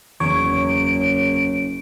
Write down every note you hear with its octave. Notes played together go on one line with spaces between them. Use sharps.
F#1 E2 C#5 D7